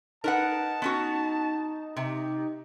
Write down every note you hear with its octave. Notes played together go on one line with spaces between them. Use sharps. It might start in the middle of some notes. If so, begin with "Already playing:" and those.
D#4 A#4 B4 F#5 A5
B3 C#4 F#4
C3 G4